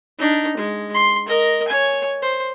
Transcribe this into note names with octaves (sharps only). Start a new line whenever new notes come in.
D4 D#4
G#3
C6
A#4 D#5
C#5 G#5
C5